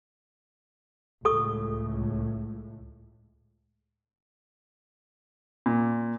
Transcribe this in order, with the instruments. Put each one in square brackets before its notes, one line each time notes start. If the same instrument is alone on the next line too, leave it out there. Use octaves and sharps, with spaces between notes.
[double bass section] C#2 A2 [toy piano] A4 C#6 D#6
[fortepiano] A#2